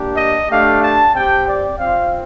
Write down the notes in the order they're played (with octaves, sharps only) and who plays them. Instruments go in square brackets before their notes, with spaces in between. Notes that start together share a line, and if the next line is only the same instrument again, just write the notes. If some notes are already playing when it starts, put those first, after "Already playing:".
Already playing: [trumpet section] A#3 D4 G4
D#5
A3 D4 G4 F5
A5
C4 G4 G5
D5
C4 F4 F5